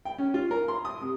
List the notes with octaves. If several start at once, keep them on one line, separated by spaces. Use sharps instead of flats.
G5
C#4
F4
A#4
C6
D#6
C3